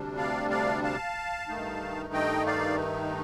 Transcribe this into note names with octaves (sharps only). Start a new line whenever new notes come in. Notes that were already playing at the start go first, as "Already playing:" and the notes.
Already playing: D2 C3 G3 D4
D5 F5
D5 F5
F5 A5
G2 D#3 A3 D#4
D#5 G5
D5 F5